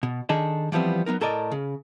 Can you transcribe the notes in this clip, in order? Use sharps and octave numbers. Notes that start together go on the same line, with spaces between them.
B2
D#3 D4 G#4 A4 D#5
E3 F3 G3 B3 C4
F#3 B3 D#4 A#4
A2 A4 A#4 D5 D#5
C#3